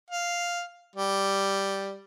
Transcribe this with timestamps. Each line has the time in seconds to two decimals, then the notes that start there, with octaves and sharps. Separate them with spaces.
0.11 F5
0.96 G3